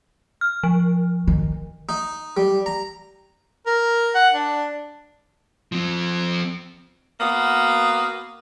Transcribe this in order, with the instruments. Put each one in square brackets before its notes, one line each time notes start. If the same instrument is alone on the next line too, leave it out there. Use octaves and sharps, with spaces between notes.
[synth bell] F6
F3
[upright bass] D#3
[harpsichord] D#4
G3
A#5
[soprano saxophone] A#4
F#5
D4
[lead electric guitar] F3 C4
[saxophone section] A#3 B3 F#4